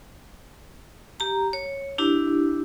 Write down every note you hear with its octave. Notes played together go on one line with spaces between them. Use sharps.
G4 A#5
C#5
D4 E4 G4